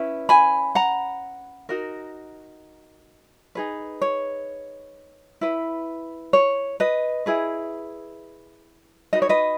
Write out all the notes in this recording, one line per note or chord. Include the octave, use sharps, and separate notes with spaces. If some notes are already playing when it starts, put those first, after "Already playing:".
Already playing: C#4 E4 B4
G#5 B5
F#5 A#5
D#4 F#4 A#4
D#4 G#4 B4
C#5
E4 B4
C#5
B4 D#5
E4 G#4 B4
D#4 F#4 B4 D#5
C#5
B4 D#5